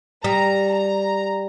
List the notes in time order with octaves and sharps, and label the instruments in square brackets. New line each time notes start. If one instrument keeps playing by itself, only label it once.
[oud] G3 [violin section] A#5
[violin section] A#5